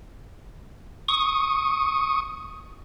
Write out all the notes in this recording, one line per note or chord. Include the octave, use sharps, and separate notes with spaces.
C#6 D#6